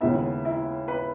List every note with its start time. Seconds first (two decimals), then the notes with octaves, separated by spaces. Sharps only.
0.01 D#2 C#3 G#3 B3 E4 E5
0.45 E4 E5
0.88 B4 B5